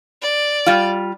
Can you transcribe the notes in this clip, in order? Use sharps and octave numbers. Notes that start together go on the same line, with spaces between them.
D5
G3 F4